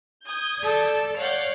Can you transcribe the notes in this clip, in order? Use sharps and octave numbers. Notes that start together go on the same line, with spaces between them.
D#6 G6 G#6
A4 D5
C#5 D5 F5 F#5 G6